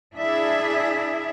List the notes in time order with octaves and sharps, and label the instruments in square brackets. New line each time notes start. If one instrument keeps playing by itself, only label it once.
[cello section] D4 E4 G#4 E5